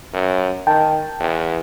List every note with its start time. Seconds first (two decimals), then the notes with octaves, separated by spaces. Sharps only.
0.14 F#2
0.67 D#3 G5 A5
1.20 E2